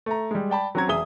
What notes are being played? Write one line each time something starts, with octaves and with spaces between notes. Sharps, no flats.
A3 A#5
G3 G#3
D5 G5 A5 B5
F#3 C4 C#4 F#4 A#5 G#6
E1 G#4 E5 D#6 G7